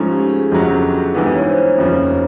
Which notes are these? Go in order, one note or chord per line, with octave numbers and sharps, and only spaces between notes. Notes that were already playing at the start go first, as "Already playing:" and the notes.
Already playing: G#2 F3 A3 C#4 F4
G4
G#4
G1 F2 C#3 F#3 A4
G#1 G2 E3 G3 B3
C#5
C5
F1 D#2 C#3 F3